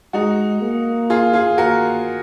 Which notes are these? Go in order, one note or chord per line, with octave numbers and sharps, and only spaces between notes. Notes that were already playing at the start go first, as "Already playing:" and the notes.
G#3 D#4 F#4
A#3
F4 G#4
F4 G#4
A#3 F#4 A#4